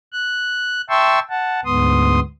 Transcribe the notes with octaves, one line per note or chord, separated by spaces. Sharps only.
F#6
E5 G5 A5 C6 C#6 E6
F#5 A5
D2 G#2 B3 C6 D#6